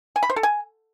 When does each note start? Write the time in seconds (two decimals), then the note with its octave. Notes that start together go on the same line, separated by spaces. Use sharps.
0.16 G#5
0.23 B5
0.30 C5
0.36 A4
0.43 G#5